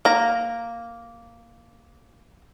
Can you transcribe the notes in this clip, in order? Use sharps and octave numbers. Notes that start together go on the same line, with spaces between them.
A#3 A#5